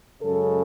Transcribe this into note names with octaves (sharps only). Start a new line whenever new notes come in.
F#2 C#3 G#3 A4